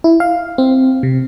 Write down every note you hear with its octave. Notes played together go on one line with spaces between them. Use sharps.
E4
F5
C4
C3